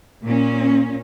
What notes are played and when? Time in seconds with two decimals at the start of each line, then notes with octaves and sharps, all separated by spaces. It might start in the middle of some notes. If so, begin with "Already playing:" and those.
0.24 A#2 C#4